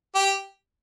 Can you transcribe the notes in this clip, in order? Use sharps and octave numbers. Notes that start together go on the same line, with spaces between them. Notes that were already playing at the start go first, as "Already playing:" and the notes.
G4